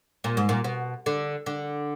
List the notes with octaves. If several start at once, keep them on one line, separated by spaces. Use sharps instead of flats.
A#2
G#2
A#2
B2
D3
D3